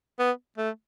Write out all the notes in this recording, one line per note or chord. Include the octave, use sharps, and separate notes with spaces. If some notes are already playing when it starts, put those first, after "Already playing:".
B3
A3